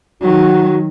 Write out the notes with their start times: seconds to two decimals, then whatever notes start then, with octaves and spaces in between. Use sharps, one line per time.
0.21 D#3 F#3 F#4